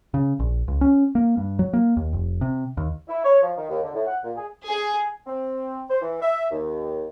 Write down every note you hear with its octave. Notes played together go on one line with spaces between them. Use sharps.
C#3
A#1
C#2
C#4
A#3
G2
F#3
A#3
D#2
F1
C3
D#2
E4
C#5
F3
D#3
D#2
D3
A2
F#5
A#2
G#4
G#4
C4
C5
E3
E5
D#2